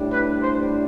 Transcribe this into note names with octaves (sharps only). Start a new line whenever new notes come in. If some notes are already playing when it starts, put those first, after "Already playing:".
Already playing: A2 G3 D4
B4
C5